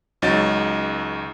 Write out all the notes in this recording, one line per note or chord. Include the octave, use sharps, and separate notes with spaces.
C#2 F#3 D#4 A6